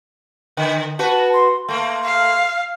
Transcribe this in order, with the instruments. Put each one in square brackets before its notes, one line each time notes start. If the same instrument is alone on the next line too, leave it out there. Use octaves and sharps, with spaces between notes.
[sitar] D3
[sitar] F#4 B4 [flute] A5
[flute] C6
[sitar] A3 A#3 [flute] C6
[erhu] F5